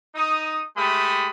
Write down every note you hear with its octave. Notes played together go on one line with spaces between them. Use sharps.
D#4 D#6
G#3 A3 G4 B5 D#6